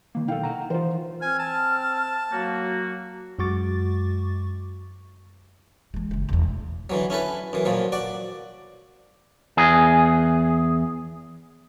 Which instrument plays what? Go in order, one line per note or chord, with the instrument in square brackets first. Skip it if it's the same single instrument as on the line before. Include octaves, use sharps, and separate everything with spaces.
[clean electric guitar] D#3 A#3
[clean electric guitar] B1 A4 [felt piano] D#3 F5 G5
[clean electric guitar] F#5 A#5
[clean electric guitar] E3 F4 [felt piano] C5
[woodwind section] C4 F6 [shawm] G#5
[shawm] A5
[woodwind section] F#3 A#3 F#4
[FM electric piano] F#2 G#3 F#4 C#6 D6 A6
[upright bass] E3 G#3
F#1 E3
E1 E2
A3
[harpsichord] D3 E3 F#3
C#4 E4 A4 B4
F#2 E3
A#2 F3 F#3
F#4 D5
[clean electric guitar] E2 G#4